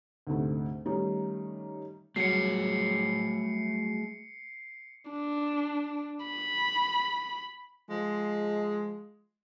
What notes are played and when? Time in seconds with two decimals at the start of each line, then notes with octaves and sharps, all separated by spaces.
0.27 D2 G#2 C3 A3
0.86 D#3 G3 A3 C#4 D#4
2.16 F#3 G3 A3 F#4 G#4 C#5 C7 C#7
5.10 D4
6.26 B5
7.90 F3 G#3